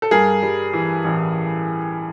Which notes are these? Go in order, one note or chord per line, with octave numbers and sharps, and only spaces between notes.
A4
G2 G#4 A#4
G3
E3
A1